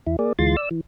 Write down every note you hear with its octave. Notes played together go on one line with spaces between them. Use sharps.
E2 E4
A#3 G#4 D5
D2 E3 G#3 F4 C6 A6
D5 E6
E3